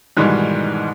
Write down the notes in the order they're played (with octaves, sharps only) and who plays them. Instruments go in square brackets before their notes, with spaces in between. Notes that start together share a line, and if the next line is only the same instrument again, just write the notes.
[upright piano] G#2 B2 D#3 E3 G3 G#3